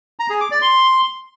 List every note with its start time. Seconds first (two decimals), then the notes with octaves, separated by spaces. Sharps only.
0.19 A#5
0.30 G#4
0.41 D6
0.51 D5
0.62 C6